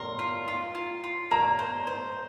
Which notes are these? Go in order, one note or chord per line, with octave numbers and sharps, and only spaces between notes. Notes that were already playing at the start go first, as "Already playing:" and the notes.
Already playing: A#4 C6
F4
F4
F4
F4
A#3 A#5
C5
C5